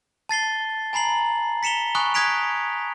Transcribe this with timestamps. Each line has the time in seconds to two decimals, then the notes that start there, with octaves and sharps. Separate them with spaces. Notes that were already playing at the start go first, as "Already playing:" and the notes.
0.29 A5 A6 C7 G7
0.93 G#5 A#5 B5 C7 F#7
1.63 B6 C#7 E7 F7 G7
1.95 G#5 B5 C#6 D#6 F#6
2.14 D#6 F#6 G#6 B6 D7 F7